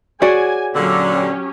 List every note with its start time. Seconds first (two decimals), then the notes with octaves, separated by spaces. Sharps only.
0.22 F#4 G#4 C#5 D5 G#5
0.74 A#2 D3 F#3 C#4 G4